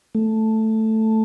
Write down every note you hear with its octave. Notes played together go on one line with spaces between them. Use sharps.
A3